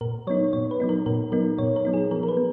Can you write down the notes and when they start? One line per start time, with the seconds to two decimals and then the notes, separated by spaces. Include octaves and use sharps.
0.01 A#2 A#4
0.27 F#3 B3 D#4 C#5
0.53 A#2 C#5
0.71 B4
0.80 F#3 B3 D#4
0.89 A#4
1.06 A#2 A#4
1.32 F#3 B3 D#4 A#4
1.58 A#2 C#5
1.76 A#4
1.85 F#3 B3 D#4
1.93 G#4
2.11 F3 A#4
2.23 A#4
2.28 B4
2.37 B3